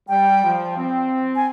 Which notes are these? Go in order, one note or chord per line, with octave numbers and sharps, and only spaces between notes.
G3 G5
F3
C4
G#5